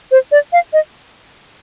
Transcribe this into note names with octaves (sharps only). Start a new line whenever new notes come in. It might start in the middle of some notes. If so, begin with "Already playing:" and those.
C5
D5
F5
D#5